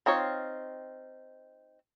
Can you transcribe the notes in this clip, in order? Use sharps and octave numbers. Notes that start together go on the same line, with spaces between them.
C4 D#4 F4 C#5